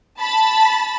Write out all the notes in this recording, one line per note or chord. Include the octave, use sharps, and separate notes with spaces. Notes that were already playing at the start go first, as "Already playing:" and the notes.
A5 B5 A6